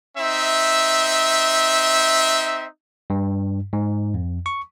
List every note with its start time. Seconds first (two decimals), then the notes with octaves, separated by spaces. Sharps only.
0.18 C4 D#4 E5
3.10 G2
3.73 G#2
4.14 F2
4.46 C#6